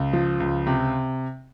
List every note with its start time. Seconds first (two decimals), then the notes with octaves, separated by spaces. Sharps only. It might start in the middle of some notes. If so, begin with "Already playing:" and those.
Already playing: C#2
0.13 F3
0.40 C#2
0.67 C3